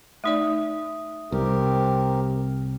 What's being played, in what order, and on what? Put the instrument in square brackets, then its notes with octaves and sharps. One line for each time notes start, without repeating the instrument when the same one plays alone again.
[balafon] A3 D#4 D5 [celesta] E5 D#6
[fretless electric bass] C2 [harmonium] C4 G4 A#4